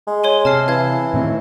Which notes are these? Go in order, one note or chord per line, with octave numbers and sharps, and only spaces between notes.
G#3
C#5 C6 D#7
C3 A5 F6 C7
E3 F5 G#6
A2 D#3 C4